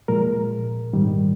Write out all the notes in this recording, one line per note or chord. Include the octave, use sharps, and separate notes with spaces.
A#2 F3 G#3 A#4
G#2 D#3 G3